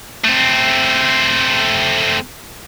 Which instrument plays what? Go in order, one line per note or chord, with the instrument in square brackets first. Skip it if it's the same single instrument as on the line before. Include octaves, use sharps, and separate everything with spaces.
[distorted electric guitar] A3 C4